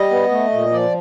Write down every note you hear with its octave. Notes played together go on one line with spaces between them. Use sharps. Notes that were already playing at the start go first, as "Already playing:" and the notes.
Already playing: G3 D#5
B3
A3
A#2
F3 D5